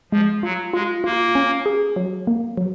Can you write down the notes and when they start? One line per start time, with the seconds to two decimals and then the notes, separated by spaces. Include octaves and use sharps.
0.12 F3 G#3
0.43 F#3 F4
0.73 G#3 F4
1.04 A#3 F4
1.35 C#4
1.66 G#4
1.96 F#3
2.27 A#3
2.57 F#3